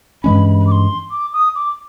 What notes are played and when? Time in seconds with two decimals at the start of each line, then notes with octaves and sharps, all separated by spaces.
0.23 G2 E3 G#3 C#4 B5
0.59 B5
0.67 D6
0.72 C6
1.11 D6
1.33 D#6
1.55 D6